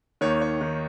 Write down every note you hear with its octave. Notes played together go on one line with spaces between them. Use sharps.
D#2 D#3 C#5
C#5
D#3